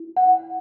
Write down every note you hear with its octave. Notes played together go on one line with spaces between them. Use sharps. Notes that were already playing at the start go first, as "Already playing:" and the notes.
Already playing: E4
F#5